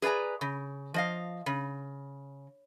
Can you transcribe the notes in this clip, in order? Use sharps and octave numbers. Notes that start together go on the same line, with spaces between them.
G#4 B4 D5 G#5 A#5
C#3
F3 D#5 F5
C#3